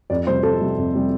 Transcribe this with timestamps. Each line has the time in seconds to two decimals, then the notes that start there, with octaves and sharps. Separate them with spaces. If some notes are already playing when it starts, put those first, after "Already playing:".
0.10 F2 D5
0.27 C3 G3 C5
0.43 F2 A4
0.60 C3 G3
0.77 F2
0.94 C3 G3